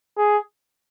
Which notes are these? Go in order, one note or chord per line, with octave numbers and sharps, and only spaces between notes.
G#4